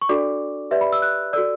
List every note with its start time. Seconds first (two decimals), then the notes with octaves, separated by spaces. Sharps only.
0.02 C#6
0.09 D4 F#4 A4 D5 D6
0.71 G4 B4 D5 E5
0.81 B5
0.93 E6
1.02 F#6
1.33 F#4 A4 D5 E6